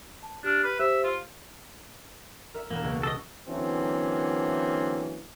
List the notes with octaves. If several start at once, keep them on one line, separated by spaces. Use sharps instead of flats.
A5
D4 G4 F6
B4
G4 C5 E5
F4
A#4 E5
E1 A#3 B3 E7
C#2
A4 D#5 D6
D3 E3 F#3 A#3 C4 C#4